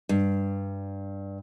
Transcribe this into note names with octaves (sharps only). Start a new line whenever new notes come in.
G2